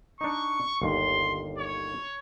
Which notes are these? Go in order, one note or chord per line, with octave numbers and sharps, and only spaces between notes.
D4 D#4 C#6
G1 D#2 C6
C#5